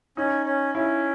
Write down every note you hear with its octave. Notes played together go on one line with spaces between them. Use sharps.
C#4 D#4
C#4
C#4 E4